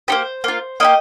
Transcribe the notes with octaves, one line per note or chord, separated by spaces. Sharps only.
A#3 D#4 G4 C5
A#3 F4
A#3 D#4 G4 D#5